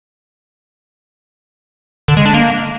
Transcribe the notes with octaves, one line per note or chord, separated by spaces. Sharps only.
D3
G#3
D4
A#3